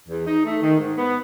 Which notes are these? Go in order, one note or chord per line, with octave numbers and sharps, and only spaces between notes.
E2
D#4
A3
D#3
G#2
B3